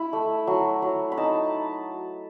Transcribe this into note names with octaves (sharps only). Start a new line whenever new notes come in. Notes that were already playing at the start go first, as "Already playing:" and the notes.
Already playing: E4 B5
A3
F#3
F#3
B5
D#4 A5